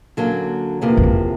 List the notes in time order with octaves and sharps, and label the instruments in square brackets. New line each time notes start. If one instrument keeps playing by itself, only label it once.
[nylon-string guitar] D3 F#3 A#3 C#4
E2 C3 F3 A#3
[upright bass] F2